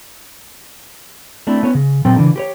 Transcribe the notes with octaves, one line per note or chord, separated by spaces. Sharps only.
A3 C4 D4 E4
B3 C#4 C#5
C#3
A#2 F#3 C4 A4 G5
C#3 E3 D4
G4 B4 C#5